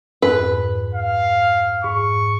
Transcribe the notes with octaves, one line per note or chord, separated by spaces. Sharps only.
F2 G#2 B4
F5
G#2 C#6